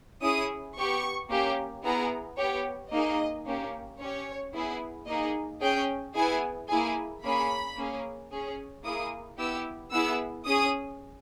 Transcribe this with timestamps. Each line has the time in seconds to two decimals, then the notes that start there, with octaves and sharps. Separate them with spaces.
0.21 C#4 E4 G#4 D#6
0.77 B3 G4 C#6
1.29 A#3 C#4 G4
1.83 B3 E4 G#4 A#5
2.37 G4 C#5
2.42 B3
2.91 A#3 D#4 G#4 D#5
3.46 A#3 C#4 G4
4.00 C#4 G4 C#5
4.53 B3 E4 G#4
5.07 A#3 D#4 G#4 D#5
5.61 C#4 G#4 G5
6.15 B3 E4 G#4 G#5
6.68 A#3 E4 G#4 G#5
7.22 A#3 C#4 G#4 B5
7.77 A#3 C#4 G#4
8.31 C#4 G#4
8.84 A#3 E4 G#4 D#6
9.38 B3 E4 G4 E6
9.92 B3 E4 G#4 E6
10.46 C#4 G#4 D#6